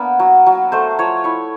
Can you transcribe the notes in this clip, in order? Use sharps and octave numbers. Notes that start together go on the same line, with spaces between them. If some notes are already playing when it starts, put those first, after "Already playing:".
Already playing: A#3 B3 D4
F#3
F#3
A3 C5
F3 C#5
E4 C#5